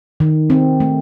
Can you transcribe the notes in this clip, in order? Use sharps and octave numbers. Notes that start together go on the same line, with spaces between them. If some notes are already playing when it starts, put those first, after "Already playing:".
D#3
C4
A3